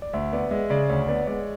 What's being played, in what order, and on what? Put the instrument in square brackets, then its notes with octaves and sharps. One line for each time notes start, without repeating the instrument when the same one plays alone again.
[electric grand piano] D5
[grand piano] D2 [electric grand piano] E5
[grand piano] B3 [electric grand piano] D5
[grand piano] G#3 [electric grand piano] E5
[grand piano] C#3 [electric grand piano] D5
[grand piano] D2 [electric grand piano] C#5
[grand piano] B3 [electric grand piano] D5
[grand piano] G#3 [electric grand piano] D5